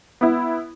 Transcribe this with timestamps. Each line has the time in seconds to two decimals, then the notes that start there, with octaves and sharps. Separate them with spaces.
0.21 B3 E4